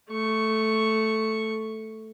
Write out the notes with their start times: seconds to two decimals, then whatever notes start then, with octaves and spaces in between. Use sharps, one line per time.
0.10 A3 C#6